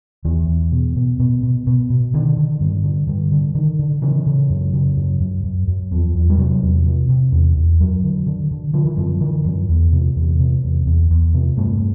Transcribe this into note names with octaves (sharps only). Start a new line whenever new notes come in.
E2 E3
E2
B2
B2
B2
B2
B2
B2
D3 D#3
D3
G2
D3
G2 D3
D3
D3 D#3
D3
C#3 E3
C#3
F#2
C#3
F#2
F#2
F#2
F#2
E2 F3
E2
G3
C3 F#3
E2
C3
C3
E2
E2
F#2 F#3
D3
D3
D3
D3 F3
E3
F#2 F3
D3 E3
F#2
E2
C3
E2
C3
E2
E2
E2
C3
G2 A3